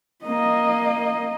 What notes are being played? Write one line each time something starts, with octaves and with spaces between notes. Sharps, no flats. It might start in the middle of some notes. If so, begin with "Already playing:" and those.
A#3 D#5